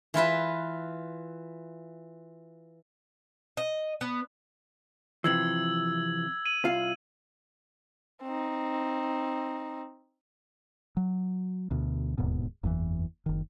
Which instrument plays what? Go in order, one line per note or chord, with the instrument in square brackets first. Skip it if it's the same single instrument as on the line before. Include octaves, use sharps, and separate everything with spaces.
[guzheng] E3 F4 B4 E5
[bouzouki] D#5
B3
[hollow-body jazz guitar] C3 E3 F3 [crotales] E6 G#6 F#7
[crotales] D#7 F#7
[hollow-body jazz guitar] C2 F4 F5
[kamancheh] C4 D#4
[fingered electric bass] F#3
D2 B2
D1 D#2 G#2 B2
F#1 E2 D#3 E3
F#1 D#3